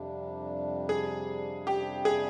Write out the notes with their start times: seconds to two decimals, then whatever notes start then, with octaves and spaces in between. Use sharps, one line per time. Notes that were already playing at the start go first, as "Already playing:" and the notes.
Already playing: F2 C3 G3 D4
0.89 G#4
1.67 G4
2.05 G#4